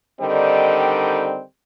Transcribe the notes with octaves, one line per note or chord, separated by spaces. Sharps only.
D3 D#3 G3 C4 D#4